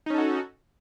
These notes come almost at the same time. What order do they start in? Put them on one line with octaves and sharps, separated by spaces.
D#4 C#4 A4 F#4